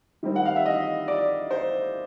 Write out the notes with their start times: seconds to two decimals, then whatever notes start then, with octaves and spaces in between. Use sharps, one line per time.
0.23 D#3 G3 C4
0.36 F#5
0.45 F5
0.56 E5
0.65 D#5
1.08 D5
1.51 C5